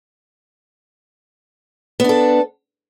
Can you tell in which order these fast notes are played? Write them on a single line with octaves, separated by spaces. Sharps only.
B3 D4 A4